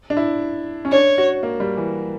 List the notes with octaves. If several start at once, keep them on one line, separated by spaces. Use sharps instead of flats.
D4
E4
C#4
D4 C#5
F#4
A#3
G3
E3